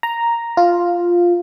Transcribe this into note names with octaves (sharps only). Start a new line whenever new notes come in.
A#5
F4